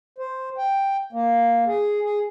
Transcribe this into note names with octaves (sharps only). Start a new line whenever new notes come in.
C5
G5
A#3
G#4
G#4